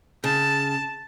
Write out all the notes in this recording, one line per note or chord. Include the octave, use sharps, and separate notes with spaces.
C#3 A5